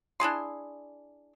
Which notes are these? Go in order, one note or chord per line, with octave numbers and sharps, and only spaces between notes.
D4 E4 G#4 C6